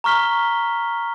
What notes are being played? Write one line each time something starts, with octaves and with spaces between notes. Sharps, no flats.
A#5 C#6 F6 B6 G7